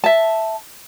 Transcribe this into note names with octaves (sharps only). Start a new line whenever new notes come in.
E5 A5